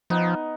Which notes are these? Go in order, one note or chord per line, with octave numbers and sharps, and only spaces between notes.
F3 B3 D#4